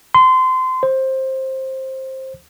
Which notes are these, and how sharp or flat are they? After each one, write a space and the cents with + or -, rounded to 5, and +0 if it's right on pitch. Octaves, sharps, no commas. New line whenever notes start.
C6 -25
C5 +15